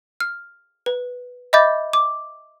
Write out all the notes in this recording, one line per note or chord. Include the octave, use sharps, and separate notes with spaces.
F6
B4
D#5 E5 B5 D6 G6 A6
D6